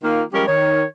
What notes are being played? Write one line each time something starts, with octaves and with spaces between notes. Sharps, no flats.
D#3 A#3 F4
F3 G3 G#3 C#4 G4 A#4
D#3 C#5